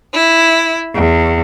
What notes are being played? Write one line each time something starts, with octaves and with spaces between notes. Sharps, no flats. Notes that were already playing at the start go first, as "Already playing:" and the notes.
E4
E2